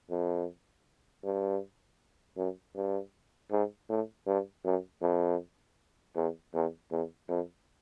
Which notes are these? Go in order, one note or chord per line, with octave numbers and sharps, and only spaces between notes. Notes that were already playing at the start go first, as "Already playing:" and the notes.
F2
G2
F#2
G2
G#2
A2
G2
F#2
F2
E2
E2
E2
F2